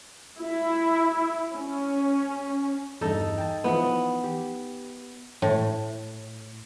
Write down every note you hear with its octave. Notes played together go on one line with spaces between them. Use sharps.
E4
C#4
E2 G2 D#4 A4
G5 A5
E3 F3 B3 D#6
G4
A2